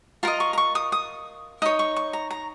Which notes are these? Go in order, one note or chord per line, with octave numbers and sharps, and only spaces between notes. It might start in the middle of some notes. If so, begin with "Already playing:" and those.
F4 A#4 D#5 A#5
C#6
A#5
C#6
D#6
D#6
D#4 C#5 D#6
C#6
C#6
A#5
A#5